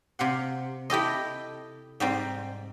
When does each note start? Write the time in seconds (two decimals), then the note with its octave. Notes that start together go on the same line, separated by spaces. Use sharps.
0.19 C3 F5 F#5
0.90 E4 G4 A4 D#5
2.00 G#2 G3 C4